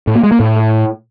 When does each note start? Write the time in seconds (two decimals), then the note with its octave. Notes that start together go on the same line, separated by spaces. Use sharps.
0.07 A2
0.15 A#3
0.23 G#3
0.32 A#3
0.40 A2